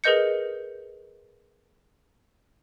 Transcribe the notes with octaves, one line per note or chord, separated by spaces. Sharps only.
G#4 A#4 B4 D#5 G6 C#7